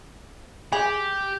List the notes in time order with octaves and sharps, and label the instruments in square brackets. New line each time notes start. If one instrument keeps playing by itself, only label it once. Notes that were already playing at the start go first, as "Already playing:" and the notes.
[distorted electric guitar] G4 [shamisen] G#4